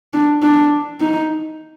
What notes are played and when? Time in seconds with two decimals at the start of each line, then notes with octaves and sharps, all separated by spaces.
0.14 D4
0.42 D4
1.01 D#4